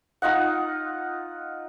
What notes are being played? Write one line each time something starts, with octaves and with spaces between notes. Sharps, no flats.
D#4 F4 D#5 F#5